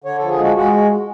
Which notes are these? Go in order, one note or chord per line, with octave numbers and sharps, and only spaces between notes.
D3 C#5
F3 A4
G#4
G#3
F#4
G#3 F#4